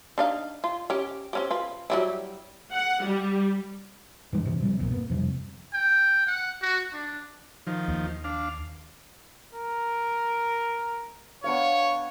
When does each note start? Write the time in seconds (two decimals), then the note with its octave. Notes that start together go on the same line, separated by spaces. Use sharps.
0.18 D4 D#4 F5
0.64 F4
0.90 C#4 G4
1.33 C4 C#4 G4
1.51 F4 B4
1.90 F#3 G3 E4
2.73 F#5
3.04 G3
4.33 G2 E3 G#3 D4
4.45 A2 C3 E3
4.61 C3 F3 G3 C4
4.79 E1 B1 F#2 A#2
4.92 A#3 B3
5.10 F2 C3 G3
5.73 G5
6.27 F#5
6.62 F#4
6.92 D4
7.67 D#3 F3
7.88 D#2
8.24 D4 F5
9.53 A#4
11.44 B3 D4 C#5 F5